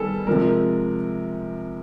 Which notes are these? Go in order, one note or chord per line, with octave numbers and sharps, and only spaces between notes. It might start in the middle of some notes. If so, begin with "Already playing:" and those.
Already playing: D#3 G3 B3 G#4 A4
C3 F3 G#3 A#4